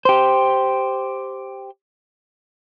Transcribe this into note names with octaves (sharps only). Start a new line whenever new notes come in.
G4 C5